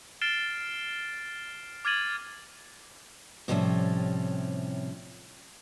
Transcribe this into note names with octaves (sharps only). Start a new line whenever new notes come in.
F6 A6 C7 D7 E7 G7
D6 F6 G#6 A6 D#7 F#7
A2 C3 F3 G3 C#4